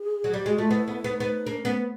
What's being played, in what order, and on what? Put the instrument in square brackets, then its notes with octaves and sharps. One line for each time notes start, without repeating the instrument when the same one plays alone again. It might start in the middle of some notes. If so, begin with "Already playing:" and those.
Already playing: [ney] G#4
[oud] F#3
[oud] G3 [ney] G4
[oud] G#3 [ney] F#4
[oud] A3 [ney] F4
[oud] B3 [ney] E4
[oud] B3
B3
[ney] E4
D#4
[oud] B3
[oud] A#3 [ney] D4
[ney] C#4
[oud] B3